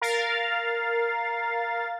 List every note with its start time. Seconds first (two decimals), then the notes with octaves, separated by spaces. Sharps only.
0.01 A#4 F5 A6